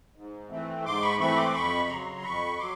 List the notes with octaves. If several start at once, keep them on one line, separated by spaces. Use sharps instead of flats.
G#2
E3 A3 C4
G#2 C6 D6
B5 C#6
E3 A3 C4 B5 C#6
C6 D6
F2 B5 C#6
C#3 F#3 A#5 C6
F2 B5 C#6
F#3 C6 D6